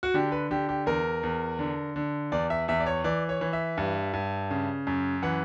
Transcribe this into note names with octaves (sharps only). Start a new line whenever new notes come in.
F#4
D3 G4
B4
D3 G4
G4
E2 A#4
E2
D3
D3
E2 D5
E5
E2 E5
D5
C#5
E3 D5
C#5
E3
E5
G2
G2
C#3
F#2
E3 F#5